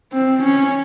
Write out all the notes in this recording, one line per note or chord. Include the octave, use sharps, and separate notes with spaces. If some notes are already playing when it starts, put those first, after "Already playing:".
C4
C#4